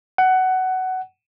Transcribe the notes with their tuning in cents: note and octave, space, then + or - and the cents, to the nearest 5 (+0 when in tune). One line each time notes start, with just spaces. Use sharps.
F#5 +15